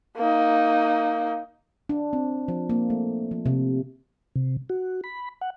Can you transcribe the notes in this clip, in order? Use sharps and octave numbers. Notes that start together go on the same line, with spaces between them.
A#3 D#4
D4
C4
F3
A#3
A3
F3
C3
C3
F#4
B5
F#5